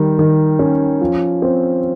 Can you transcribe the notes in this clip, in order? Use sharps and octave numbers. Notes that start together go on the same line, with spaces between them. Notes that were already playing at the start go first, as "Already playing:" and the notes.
Already playing: D#3 G3
D#3
C#4
F3
C4